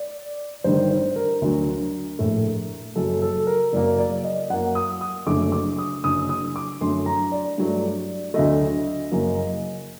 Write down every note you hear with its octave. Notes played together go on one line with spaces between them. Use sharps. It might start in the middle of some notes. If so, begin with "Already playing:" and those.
Already playing: D5
G1 G2 D#3 C5
C5
A#4
D2 D3 F#3
A#1 A2 A3
F#1 F#2 F#3 A4
A4
A#4
F#1 F#2 F#3 A#3 D5
D5
D#5
F#2 F#3 A#3 F#5
D#6
D#6
F#1 F#2 D3 A3 D6
D6
D#6
F#1 F#2 D3 D#6
D#6
D6
F#2 D3 A3 C6
A#5
D5
G2 F#3 A3
D2 D3 F#3 A3 D#5
F#1 F#2 F#3 A#3